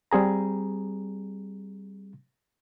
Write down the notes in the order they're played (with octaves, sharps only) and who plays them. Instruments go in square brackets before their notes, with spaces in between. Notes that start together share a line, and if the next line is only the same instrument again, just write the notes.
[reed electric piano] G3 C4 G#4 A#5